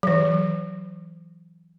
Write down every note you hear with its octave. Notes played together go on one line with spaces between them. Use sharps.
E3 F#3